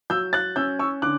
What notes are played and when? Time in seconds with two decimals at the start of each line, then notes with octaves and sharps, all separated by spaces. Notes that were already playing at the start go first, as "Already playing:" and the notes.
0.10 F#3 E6 G6
0.33 F#6 A6
0.56 C#4 E6 G6
0.79 C#6 E6
1.02 D3 D6 F#6